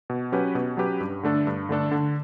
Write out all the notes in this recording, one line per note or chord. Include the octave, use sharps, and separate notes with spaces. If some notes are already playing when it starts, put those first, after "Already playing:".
B2
F#3 C#4 G4 B4
B2
F#3 C#4 G4 B4
G2
D3 A3 D4 A4
G2
D3 A3 D4 A4
D3